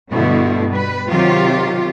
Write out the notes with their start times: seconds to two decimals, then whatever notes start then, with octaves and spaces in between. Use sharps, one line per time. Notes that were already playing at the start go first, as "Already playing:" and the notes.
0.12 G2 B2 D3 A3 E4
0.70 G3 B4
1.07 C3 D#3 F#3 F4 G4